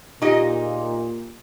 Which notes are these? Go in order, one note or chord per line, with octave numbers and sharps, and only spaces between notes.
A#2 D#4 F4 G4 G#4 D#5